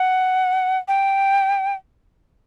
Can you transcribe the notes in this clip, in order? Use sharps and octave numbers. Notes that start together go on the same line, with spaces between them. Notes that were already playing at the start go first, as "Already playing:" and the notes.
Already playing: F#5
G5